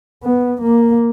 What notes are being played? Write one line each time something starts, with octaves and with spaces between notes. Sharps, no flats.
B3
A#3